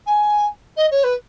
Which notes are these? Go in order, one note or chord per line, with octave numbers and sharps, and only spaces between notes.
G#5
D#5
C#5
B4